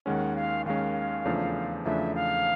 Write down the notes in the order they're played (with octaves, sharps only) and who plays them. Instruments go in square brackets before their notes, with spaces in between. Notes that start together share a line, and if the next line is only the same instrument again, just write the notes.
[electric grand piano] D#2 D#3 G#3 C#4 [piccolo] F#5
[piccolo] F5
[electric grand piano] D#2 D#3 G#3 C#4 [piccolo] F5
[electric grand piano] E2 C#3 F3 A3 D4
[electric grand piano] E2 C#3 F3 A3 D4 [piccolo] E5
[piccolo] F5